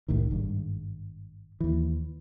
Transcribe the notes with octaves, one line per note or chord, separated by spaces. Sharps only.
C2 A2 D#3
G#1 G2
D#2 E3